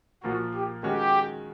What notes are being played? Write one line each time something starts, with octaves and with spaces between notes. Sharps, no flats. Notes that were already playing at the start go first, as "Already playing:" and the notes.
A#2 F3 A#3 F#4
G4
D#3 G#3 C#4 F#4 G4